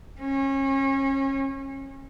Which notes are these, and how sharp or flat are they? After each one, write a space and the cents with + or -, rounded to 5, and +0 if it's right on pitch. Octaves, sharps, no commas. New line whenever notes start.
C#4 -30